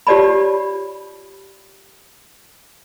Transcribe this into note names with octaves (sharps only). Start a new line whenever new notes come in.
F4 G4 C#5 D5 A5 B5